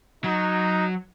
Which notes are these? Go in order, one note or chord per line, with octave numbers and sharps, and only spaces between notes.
F#3 D#4